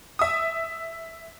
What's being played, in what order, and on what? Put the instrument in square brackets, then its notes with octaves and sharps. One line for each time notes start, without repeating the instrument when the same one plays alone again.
[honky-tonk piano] E5 D#6